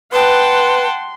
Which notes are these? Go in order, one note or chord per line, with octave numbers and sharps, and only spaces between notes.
B4 F#5 G5 A5 C6